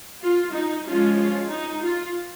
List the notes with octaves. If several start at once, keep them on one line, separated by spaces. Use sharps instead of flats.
F4
D#4
F3 G#3 C#4 F4
F4
D#4
F4